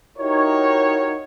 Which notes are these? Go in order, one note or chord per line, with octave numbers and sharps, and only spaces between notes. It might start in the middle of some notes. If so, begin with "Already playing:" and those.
D#4 E4 F#4 G4 A#4 C#5